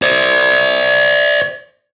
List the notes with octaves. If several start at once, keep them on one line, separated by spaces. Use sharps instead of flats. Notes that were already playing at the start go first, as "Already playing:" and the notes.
C5 D5